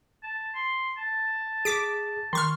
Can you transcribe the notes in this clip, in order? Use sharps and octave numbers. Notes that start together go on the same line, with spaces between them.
A5
C6
A5
G#4 D6 B6 D7
D#3 C6 C#6 F6